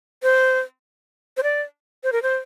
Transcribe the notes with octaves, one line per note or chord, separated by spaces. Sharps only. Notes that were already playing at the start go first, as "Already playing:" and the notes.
C5
C5
D5
C5
A#4
C5